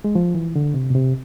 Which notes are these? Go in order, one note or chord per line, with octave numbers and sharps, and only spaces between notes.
G#3
F3
E3
D3
C3
B2
C3